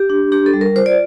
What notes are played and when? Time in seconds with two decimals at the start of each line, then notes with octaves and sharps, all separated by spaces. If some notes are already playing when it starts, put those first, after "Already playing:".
Already playing: G4
0.10 D4
0.32 D4 G4
0.46 A4
0.54 G3
0.61 A#4
0.76 F4 C5
0.86 D5